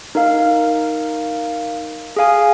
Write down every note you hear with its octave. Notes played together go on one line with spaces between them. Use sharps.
D#4 A#4 F5
G#4 F5 G#5